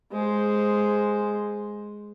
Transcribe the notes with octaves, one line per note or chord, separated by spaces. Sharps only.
G#3 C5